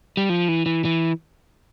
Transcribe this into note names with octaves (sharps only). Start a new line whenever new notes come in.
G3
F3
E3
E3
E3